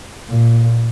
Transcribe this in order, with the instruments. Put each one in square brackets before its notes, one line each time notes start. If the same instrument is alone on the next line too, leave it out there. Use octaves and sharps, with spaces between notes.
[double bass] A#2